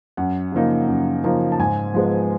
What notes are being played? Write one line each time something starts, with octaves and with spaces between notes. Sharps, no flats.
F#2 F#5
C#3 F3 A#3 D#4
F#2
C#3 F3 A#3 D#4
A5
G#2 G#5
F3 G#3 B3